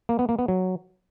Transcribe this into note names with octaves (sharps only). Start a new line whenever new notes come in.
A#3
B3
A#3
B3
F#3